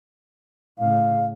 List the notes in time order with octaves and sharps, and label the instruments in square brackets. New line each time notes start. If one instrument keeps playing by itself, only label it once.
[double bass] A2 C#3 [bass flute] F5